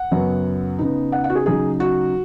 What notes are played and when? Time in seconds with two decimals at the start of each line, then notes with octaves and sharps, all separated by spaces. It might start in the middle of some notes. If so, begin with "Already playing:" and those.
Already playing: F#5
0.11 F#2 C#3 F#3 B3
0.79 C#3 B3 D#4
1.12 F#5
1.24 F#5
1.30 F#4
1.35 G#4
1.46 C#3 F#3 D#4 G#4
1.80 F#4